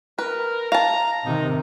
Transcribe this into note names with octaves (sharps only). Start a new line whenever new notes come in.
A#4 B4
F5 A5 A#5
C3 D#3 D#4